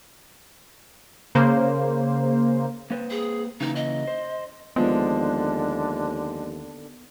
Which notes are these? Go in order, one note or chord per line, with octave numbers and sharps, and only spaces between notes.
C#3 A#3 C5
A#3 B4 C5
G#4
C#3 E3 A#3 D#4
D#5
C5
D#2 D3 F3 G#3 B3